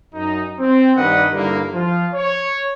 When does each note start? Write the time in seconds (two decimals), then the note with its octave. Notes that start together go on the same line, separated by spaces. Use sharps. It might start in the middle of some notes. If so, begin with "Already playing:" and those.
0.14 F#2 D#4
0.59 C4
0.96 G2 D#3 D4 B4 D#5 F#5
1.31 G2 D3 G3 A#3 D#4 E4
1.73 F3 F4
2.14 C#5